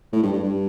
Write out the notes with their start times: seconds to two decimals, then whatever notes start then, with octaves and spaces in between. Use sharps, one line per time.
0.12 A2
0.22 G2
0.32 G2
0.43 G2